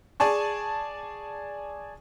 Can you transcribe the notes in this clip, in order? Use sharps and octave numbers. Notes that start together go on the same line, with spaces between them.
G#4 D5 G#5 A5 C#6